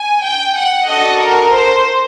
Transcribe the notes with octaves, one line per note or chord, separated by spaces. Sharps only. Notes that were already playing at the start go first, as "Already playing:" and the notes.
Already playing: G#5
G5
F#5
D4 F#4 A4 D#5
A#4
C5